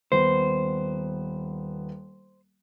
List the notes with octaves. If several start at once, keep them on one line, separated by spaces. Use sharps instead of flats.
D#1 B3 C5